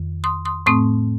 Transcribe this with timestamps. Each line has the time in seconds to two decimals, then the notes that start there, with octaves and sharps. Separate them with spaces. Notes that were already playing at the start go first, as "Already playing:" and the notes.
Already playing: F2 D#3
0.24 C6 D#6
0.45 C6 D#6
0.66 A2 A3 C4 C6 D#6